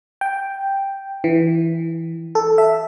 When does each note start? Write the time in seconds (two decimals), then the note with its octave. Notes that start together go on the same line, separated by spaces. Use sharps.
0.21 G5
1.24 E3
2.35 A4
2.58 E5